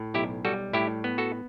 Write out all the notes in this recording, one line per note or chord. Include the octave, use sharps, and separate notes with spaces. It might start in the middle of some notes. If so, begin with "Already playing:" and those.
Already playing: A2
B1 E4 G4
G3 F#4 A4
A2 E4 G4
B3
F#4 A4